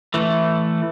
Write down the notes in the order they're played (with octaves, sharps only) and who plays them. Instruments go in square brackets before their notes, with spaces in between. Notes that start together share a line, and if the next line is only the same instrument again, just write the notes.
[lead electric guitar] E3 A3